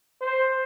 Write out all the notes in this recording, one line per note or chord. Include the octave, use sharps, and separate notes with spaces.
C5